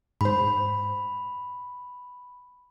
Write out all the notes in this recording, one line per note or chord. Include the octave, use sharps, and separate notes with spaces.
G#2 C5 B5